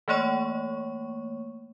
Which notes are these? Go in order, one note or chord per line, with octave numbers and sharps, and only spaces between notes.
E3 A3 A#3 C#5 C#6